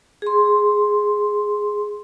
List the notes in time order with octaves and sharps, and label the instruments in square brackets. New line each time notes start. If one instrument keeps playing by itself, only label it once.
[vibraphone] G#4 C6